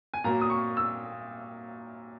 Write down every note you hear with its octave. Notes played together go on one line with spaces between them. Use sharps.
G#5
A#2 F#3 A#3 A#5
D#6
C#6
E6